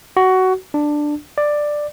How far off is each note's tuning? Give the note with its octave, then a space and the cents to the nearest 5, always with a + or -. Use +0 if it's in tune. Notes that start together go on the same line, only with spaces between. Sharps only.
F#4 +15
D4 +10
D5 +10